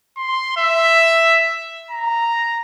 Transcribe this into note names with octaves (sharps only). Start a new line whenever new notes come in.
C6
E5
A#5